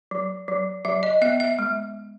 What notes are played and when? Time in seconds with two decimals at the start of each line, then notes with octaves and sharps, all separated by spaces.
0.11 F#3
0.48 F#3
0.85 F#3 E5
1.03 D#5
1.22 B3 E5
1.40 E5
1.59 G#3